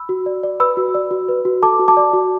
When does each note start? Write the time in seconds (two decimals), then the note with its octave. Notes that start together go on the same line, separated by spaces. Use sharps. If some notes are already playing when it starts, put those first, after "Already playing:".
Already playing: B5 E6
0.09 F#4
0.26 D5
0.43 D5
0.60 B4 B5 E6
0.77 F#4
0.94 D5
1.11 F#4
1.29 B4
1.45 F#4
1.63 A4 A5 D6
1.79 F#4
1.88 A5 D6
1.97 D5
2.13 F#4